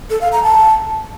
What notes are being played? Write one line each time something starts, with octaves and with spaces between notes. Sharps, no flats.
A4
F5
A#5
A5